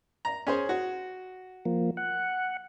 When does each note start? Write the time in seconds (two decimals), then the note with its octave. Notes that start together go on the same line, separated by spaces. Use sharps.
0.25 A#5
0.47 C#4 G#4 C5
0.69 F#4
1.65 F3 A#3
1.97 F#5